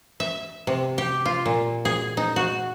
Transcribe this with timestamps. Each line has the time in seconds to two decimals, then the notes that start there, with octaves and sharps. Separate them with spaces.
0.20 E5
0.67 C3
0.98 G4
1.25 F4
1.46 A#2
1.85 G#4
2.17 D#4
2.36 F#4